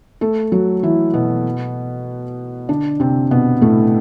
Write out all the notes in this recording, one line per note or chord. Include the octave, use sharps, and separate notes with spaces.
A3 A4
F#3 F#4
E3 E4
B2 B3
D3 D4
C3 C4
B2 B3
A2 A3